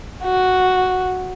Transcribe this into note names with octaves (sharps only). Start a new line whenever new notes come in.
F#4